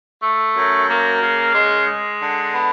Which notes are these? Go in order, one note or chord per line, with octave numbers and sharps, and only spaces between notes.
A3
F#2
A#3
C#3
G#3
G#3
D3
B3